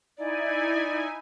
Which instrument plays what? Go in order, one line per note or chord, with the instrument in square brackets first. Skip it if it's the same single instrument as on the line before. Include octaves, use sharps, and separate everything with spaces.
[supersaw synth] D#4 E4 G#5 [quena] D5